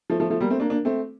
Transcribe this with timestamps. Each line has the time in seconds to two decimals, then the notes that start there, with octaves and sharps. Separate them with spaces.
0.10 F3 A3
0.20 F3 A3
0.30 F3 A3
0.41 G3 A#3
0.50 A3 C4
0.60 A#3 D4
0.70 A#3 D4
0.85 A3 C4